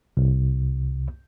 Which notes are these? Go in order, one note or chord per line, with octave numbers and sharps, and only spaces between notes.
C2